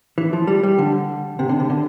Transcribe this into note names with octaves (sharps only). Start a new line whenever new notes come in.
E3
F3
G3
G3
D3
C3
D3
C3
D3